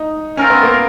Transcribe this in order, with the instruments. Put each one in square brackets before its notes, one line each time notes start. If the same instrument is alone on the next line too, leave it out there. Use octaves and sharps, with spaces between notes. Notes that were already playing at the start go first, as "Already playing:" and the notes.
Already playing: [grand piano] D#4
[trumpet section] A3 C4 F4 A#4 [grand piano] C#4
[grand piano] B3
A#3